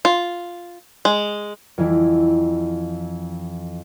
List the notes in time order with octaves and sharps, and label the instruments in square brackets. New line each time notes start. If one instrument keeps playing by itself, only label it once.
[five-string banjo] F4
G#3
[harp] F2 E3 E4